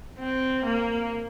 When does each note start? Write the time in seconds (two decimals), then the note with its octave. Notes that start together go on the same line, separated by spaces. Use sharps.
0.19 C4
0.65 A#3